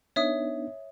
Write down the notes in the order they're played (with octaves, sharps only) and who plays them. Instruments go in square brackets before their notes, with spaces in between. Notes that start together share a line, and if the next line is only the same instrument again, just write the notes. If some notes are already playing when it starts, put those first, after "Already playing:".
[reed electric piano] B3 D4 D#4 [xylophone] C#5 E5 D#6